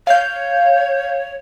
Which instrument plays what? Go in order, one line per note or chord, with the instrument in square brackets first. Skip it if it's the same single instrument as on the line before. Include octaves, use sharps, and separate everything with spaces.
[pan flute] C#5 [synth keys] F5 G6